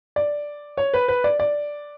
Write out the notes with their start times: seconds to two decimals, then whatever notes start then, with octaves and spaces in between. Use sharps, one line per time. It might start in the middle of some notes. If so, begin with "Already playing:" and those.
0.16 D5
0.77 C#5
0.93 B4
1.08 B4
1.24 D5
1.40 D5